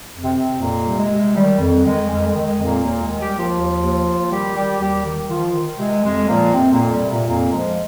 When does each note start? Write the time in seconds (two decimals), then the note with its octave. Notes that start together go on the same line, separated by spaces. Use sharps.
0.12 F2
0.24 C3 C4
0.36 C3
0.60 F2 A#2 A#3
0.86 C3 G3
0.98 G#3
1.11 C3
1.35 D#3 G3
1.59 F2
1.84 D#3 G#3
2.09 F2 G#3
2.27 G#3
2.33 D#3
2.46 G#3
2.59 F2
2.64 A#2 A#3
2.82 D#2 A#2 A#3
3.02 G#3
3.08 D#3
3.20 G3 G4
3.32 D#2
3.38 F3 F4
3.57 D#2
3.82 D#2
4.06 D#2
4.31 D#3 G3 G4
4.55 D#3 G3 G4
4.80 D#2 G3 G4
5.04 D#3
5.30 D#3 F3 F4
5.54 D#3
5.79 C3 G#3
6.03 F2 G#3
6.28 A#2 F3 A#3
6.53 F2 C3 C4
6.71 A#2 A#3
6.77 F2
6.90 G3
7.02 C3
7.08 A#2 A#3
7.27 F2 A#2 A#3
7.51 F3 G#3